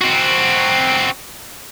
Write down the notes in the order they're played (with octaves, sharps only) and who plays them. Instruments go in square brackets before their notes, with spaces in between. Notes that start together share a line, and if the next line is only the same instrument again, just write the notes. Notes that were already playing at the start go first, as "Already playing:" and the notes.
[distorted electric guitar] C4 F#4